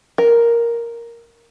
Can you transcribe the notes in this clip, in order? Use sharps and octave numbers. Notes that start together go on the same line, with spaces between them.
A#4